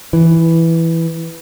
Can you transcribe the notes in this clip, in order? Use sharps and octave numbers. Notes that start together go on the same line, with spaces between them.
E3